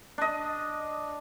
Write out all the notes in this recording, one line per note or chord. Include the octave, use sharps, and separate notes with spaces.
D4 D#5